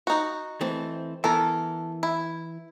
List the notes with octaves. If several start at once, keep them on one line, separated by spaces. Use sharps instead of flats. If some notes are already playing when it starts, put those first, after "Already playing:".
D#4 F#4
E3 A3 C4
E3 B3 A4 A#4
E4